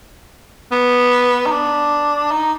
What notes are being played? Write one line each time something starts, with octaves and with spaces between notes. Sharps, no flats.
B3
D#4
D4
D#4